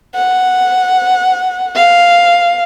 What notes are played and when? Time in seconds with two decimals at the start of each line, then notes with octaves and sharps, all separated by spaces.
0.15 F#5
1.76 F5